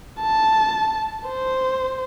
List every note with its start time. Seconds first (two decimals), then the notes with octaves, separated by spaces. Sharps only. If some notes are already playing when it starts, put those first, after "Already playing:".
0.21 A5
1.28 C5